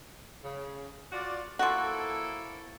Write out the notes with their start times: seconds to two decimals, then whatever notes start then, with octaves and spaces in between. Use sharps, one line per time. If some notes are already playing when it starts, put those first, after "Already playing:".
0.44 C#3
1.12 F4 F#4 D5
1.59 F3 A#3 E4 F#4 A4